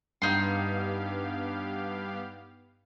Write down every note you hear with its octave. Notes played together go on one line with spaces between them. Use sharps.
G2 B3 D#4 G4 F5 C6